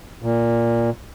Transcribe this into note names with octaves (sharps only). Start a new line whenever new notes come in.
A#2